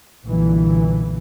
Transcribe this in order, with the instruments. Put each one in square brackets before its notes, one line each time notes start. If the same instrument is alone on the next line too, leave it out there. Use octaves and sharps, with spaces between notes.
[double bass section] B1 G2 A#2 D3 E3